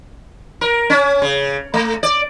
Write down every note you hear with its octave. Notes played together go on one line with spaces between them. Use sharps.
A#4
C#4
C#3
A3
D5